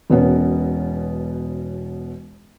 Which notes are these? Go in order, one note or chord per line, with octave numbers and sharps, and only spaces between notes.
E1 B2 B3 C#4